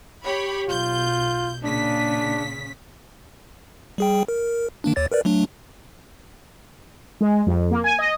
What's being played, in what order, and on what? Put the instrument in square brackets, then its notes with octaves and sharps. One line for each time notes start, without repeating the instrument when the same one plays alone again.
[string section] G4 C#5 B5
[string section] B1 G6 [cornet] F4
[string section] A#2 C#3 B6 [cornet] D4
[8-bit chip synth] G3 G#4 G5
A#4
D#3 A#3 D4
D#2 C#5 A6
A#4 B4 D5
F#3 A3 D4
[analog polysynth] G#3
F2
A#3
G#5
D#5